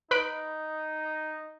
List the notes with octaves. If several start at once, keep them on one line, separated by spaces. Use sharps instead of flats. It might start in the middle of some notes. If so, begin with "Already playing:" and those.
D#4 B4 B5 D7